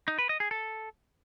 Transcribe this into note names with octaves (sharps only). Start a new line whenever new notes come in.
D#4
B4
D#5
G#4
A4